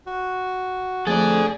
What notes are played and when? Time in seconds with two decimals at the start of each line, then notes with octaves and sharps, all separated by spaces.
0.07 F#4
1.07 F2 F3 A3 G#4 A4 D5 F#6